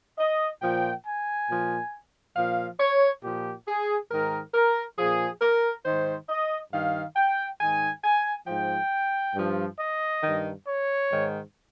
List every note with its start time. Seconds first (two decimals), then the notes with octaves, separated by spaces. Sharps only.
0.18 D#5
0.62 A#2 F3 G5
1.06 G#5
1.49 A#2 F3
2.36 A#2 F3 F5
2.80 C#5
3.23 A#2 F3 G4
3.67 G#4
4.11 G#2 D#3 A#4
4.54 A#4
4.99 A#2 F3 G#4
5.41 A#4
5.85 G#2 D#3 C5
6.29 D#5
6.72 G2 D#3 F5
7.16 G5
7.60 G#2 D#3 G#5
8.04 G#5
8.47 G#2 F3 G5
9.35 G2 F3
9.78 D#5
10.23 G2 D#3
10.66 C#5
11.10 G#2 D#3